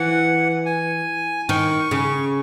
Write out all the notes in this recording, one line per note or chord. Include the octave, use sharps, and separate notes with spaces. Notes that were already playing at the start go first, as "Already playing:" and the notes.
Already playing: E3 F#5
G#5
D#3 C#6
C#3